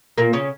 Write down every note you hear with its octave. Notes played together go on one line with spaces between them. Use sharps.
A#2 A#3
C#3 C#4